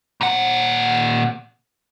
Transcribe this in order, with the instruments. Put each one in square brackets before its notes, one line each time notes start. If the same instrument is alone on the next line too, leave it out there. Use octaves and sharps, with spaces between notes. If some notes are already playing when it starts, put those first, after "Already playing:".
[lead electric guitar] A#2 F#5